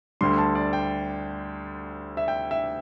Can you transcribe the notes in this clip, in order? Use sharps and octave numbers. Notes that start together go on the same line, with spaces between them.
D2 D3 G3 C6
A5
D5
G5
E5
G5
E5